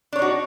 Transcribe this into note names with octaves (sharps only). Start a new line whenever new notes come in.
D4 D#4 F#4 C#5